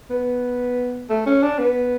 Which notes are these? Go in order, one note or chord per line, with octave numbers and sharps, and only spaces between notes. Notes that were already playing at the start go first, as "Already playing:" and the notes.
B3
A3
C#4
D4
B3